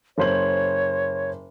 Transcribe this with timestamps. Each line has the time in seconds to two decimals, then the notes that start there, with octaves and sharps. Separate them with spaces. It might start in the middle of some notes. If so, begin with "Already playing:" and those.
0.18 F#1 C5 C#5 F#7